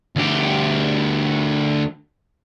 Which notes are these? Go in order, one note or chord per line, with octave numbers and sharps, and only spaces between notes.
D2 G4